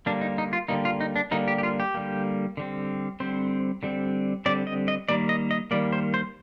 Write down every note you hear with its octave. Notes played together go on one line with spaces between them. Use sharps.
D3 G3 A#3 D4
D#4
D#4
F4
D3 G3 A#3 D#4
F4
D#4
D4
D3 G3 A#3 D#4
G4
G4
F4
G4
D3 G3 A#3
D3 G3 C4
D3 G3 C4 C5
D3 G3 C4
D3 G3 C4 D5
D#5
D#5
D#3 G3 A#3 D5
D#5
D#5
D#3 G3 A#3 D5
C5
C5